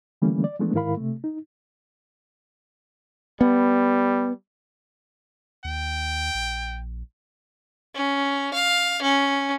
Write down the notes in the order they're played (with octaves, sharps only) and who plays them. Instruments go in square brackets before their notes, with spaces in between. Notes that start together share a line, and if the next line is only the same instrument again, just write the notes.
[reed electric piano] D3 E3 G3 A3 A#3 C#4
D5
E3 F3 G#3 A3 B3 D4
G#2 D#3 E4 A#4 F5 B5
C3 A3
D#4
[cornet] G3 [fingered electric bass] B3
[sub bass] D#2 [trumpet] G5
[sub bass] A#1
[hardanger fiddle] C#4
F5
C#4